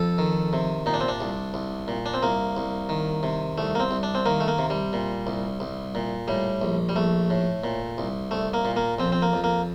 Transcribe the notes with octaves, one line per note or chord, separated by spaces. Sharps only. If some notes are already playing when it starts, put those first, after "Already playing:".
Already playing: F2 A4
D#3
C3
A#2 D#4
D4
C4
D4
C2
C2
A#2
D4
C4
C2 A#3
C2
D#3
C3
C2 A3
A#3
C4
C2
D4
C4
D#3 A#3
A3
A#3
C3
G3
A#2
C2
C2
A#2
A2 G3
A#1
G3
A#1 A3
A2
A#2
C2
C2 A3
A#3
A#2
A#3
F2 C4
C4
A#3
F2
A#3